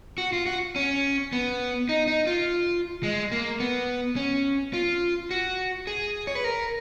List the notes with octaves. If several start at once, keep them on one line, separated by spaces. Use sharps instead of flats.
F#4
F4
F#4
C#4
B3
D#4
D#4
F4
G#3
A#3
B3
C#4
F4
F#4
G#4
C#5
B4
A#4